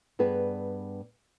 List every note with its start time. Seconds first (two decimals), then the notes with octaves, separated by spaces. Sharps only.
0.19 G2 B3 G#4 B4